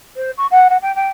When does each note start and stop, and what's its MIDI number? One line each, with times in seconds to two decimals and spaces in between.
0.16 0.31 72
0.37 0.46 85
0.51 0.67 78
0.70 0.77 78
0.82 0.93 79
0.95 1.08 79